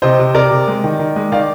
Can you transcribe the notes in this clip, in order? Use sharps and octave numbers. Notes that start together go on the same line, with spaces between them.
C3 C5 D#5
C3
C3 A#4 D5
C3
G#3
D#3
D#3
G#3
D#3 D5 F5